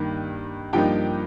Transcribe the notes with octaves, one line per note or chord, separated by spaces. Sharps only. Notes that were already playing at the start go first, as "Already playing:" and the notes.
Already playing: G2 D#3 A#3
G2 F3 A#3 D#4 G4 G5